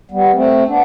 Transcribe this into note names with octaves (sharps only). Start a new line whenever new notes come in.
G3 B3
A3 C4
B3 D4